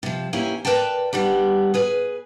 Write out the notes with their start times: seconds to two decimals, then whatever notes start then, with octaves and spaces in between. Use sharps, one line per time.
0.03 C3 F3
0.33 E2 A#3 C#4 E4 G4 G#5
0.65 A#4 B4 D5 G5 A5
1.13 G3 B3 D4 G4
1.74 G#4 B4 G#5